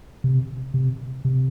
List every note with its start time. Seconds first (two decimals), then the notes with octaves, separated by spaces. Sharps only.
0.24 C3
0.74 C3
1.25 C3